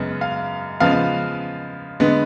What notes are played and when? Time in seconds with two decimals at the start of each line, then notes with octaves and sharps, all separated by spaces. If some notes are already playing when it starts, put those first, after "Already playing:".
Already playing: F#2 C#3 G#3 B3
0.21 F5
0.80 C#3 F3 G#3 B3 F5
2.00 D3 G#3 B3